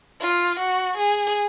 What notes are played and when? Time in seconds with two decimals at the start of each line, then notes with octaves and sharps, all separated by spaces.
0.21 F4
0.59 F#4
0.97 G#4